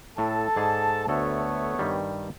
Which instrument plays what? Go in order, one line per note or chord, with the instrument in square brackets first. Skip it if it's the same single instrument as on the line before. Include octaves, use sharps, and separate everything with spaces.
[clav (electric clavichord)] A2 [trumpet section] A4 A5
[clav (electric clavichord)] G#2 G#4 D5
[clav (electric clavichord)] D2 A4 [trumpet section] A3 B3 C#5
[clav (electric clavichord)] G2 D#3 G3